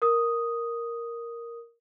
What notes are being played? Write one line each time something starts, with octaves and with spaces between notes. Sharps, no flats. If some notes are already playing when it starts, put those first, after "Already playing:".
A#4 D#6